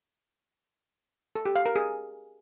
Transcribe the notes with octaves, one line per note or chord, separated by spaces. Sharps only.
A4
G4
F5
A#4
G#4